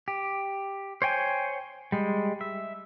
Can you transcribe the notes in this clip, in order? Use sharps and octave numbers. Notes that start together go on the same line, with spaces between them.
G4
C5 C#5 G5 G#5
G3 G#3
E5